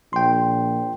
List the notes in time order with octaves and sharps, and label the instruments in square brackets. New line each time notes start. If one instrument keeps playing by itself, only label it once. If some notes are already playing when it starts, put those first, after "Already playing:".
[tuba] A#1 [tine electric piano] G5 C6